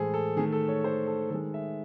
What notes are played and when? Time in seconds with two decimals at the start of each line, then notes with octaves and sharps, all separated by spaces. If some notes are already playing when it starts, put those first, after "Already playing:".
Already playing: A2 E3 G#3 G#4 A4 C5
0.14 A4
0.36 D#3 A3 G#4
0.52 A4
0.68 C#5
0.84 C5
1.07 A4
1.30 D#3 G#3 A4
1.54 E5